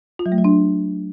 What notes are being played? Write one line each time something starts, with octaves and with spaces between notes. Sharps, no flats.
F4
F#3
A3
F#3
D4